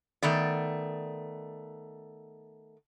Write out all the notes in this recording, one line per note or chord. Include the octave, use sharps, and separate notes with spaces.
D#3 A3 B3 D5